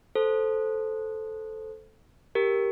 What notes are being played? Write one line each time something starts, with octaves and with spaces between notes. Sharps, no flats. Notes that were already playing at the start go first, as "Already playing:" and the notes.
A4 C5
G4 A#4